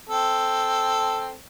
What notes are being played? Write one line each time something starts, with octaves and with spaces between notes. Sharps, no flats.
C4 A4